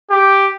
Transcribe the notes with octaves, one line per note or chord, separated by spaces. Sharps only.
G4